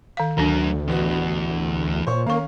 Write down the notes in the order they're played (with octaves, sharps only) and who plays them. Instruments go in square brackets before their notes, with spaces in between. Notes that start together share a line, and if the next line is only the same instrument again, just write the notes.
[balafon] D#3 F5
[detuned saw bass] D2 [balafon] D#3 D4 [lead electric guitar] F#3 A#4
[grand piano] A1 B3 F#4 [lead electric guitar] E2
[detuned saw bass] A#2 [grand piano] C5 C#5 C#6
[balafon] D#3 C#6 [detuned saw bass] A#3 [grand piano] C#4 F5